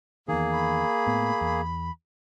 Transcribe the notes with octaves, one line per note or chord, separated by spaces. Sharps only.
E2 D#3 A#3 G#4
B5
A2 B3
E2